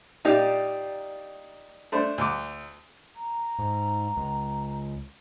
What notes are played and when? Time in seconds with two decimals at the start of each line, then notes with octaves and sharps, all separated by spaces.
0.25 A#2 D#4 G4 D5
1.92 A3 D4 C5
2.18 D2 D6
3.16 A#5
3.59 G#2
4.17 C#2